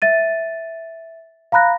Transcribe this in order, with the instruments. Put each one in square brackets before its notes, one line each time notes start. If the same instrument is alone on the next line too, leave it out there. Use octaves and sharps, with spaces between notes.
[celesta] E5 A6 D#7
F5 A#5 B5 F#6 A#6